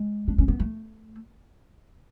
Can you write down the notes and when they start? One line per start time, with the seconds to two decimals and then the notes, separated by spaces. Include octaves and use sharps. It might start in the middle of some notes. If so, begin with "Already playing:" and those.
Already playing: G#3
0.28 D4
0.38 C#4
0.48 B3
0.60 A3